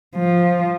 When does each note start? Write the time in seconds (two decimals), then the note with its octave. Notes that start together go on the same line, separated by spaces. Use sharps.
0.16 F3